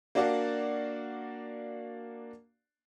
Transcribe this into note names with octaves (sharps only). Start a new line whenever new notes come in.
A#3 D4 F#4 D5 F5 F#5